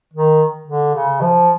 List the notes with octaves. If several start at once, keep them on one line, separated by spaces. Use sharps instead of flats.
D#3
D3
C#3
F3